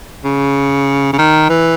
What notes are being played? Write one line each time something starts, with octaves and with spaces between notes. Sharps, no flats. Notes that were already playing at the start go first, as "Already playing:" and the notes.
C#3
C#3
D#3
E3